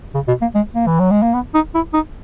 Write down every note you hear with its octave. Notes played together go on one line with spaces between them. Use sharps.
C#3
B2
A#3
G#3
A#3
E3
F#3
G#3
A#3
B3
D#4
E4
D#4